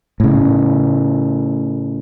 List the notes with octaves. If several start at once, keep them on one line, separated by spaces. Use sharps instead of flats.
A2 C#3